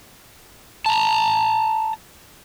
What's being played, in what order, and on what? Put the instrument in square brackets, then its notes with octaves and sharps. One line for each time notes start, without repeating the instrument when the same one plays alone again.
[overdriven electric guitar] A5 A#5